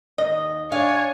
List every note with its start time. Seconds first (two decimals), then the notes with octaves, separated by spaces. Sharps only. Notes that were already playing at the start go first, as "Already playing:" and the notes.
0.18 D#2 D#5
0.72 D4 C#5 F5 G#5